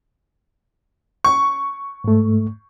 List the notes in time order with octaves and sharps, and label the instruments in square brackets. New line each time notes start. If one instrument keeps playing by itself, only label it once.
[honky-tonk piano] C#6
[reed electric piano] G#2 A3